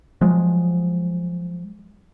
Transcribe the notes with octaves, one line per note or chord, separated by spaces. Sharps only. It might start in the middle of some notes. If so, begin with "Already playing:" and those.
F3 F#3 G#3